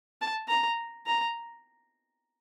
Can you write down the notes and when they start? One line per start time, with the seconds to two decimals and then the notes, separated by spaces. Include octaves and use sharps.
0.21 A5
0.49 A#5
1.06 A#5